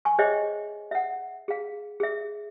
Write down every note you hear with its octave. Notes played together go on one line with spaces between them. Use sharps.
G#5 C#6
G#4 C5 C#5 D#5 E5 G5
E5 F#5
G#4 F5
G#4 E5